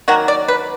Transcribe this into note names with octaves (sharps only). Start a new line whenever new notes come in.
D#3 F#3 A#3 F#4
D5
B4